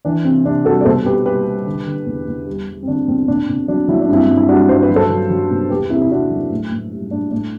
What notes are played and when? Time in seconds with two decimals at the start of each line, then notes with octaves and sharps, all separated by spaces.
0.05 E3 D4
0.24 C3 C4
0.44 C3 D4
0.65 G3 F#4 A4
0.81 D5
0.85 B2 A4 C5
1.05 B2 G4 B4
1.26 G3 G4 B4
1.45 G3
1.66 D3
1.86 D3
2.06 E2
2.27 E2
2.46 G3
2.67 G3
2.83 C4
2.88 D3 D4
3.08 E2 C4
3.28 B2 D4
3.49 B2 C4
3.68 F#3 D4
3.89 F#3 E4
4.01 D4
4.09 G2 C4 E4
4.28 G2
4.37 E4
4.48 G3 D4 F#4
4.69 G2 C5
4.83 B4
4.90 F#3
4.96 A4 C5
5.10 F#3
5.31 F#3
5.51 B2
5.70 E2 G4 B4
5.90 C3 E4 G4
6.02 E4
6.11 C3 D4 F#4
6.30 F#3
6.51 A2
6.72 A2
6.92 G3
7.11 A2 D4
7.31 A2 D4